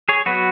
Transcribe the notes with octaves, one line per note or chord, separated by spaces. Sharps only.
G#4 C#5
F#3 B3 F#4 B4